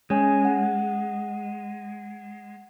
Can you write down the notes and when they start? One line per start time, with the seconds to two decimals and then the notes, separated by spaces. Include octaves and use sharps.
0.10 G#3 C#4 C#5 G#5
0.45 F#5